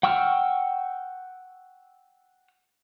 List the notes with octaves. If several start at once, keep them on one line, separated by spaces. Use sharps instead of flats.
F#5 G5 C#6 E6 F6